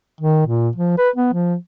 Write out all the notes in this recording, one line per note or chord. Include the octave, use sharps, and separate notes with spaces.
D#3
A#2
F3
B4
B3
F3